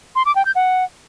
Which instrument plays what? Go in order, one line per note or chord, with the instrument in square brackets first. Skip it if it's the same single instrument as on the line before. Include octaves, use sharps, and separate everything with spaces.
[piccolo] C6
D6
G5
G6
F#5